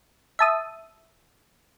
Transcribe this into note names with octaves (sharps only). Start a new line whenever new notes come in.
E5 A5 D#6